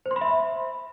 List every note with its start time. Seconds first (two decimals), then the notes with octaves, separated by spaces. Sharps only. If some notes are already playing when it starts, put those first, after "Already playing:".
0.06 C5
0.11 C6
0.16 B5
0.21 E5